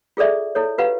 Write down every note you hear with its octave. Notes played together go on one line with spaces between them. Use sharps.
F4 G#4 A4 D5 E5
E4 A4 C#5
F4 G4 B4 F5 F#5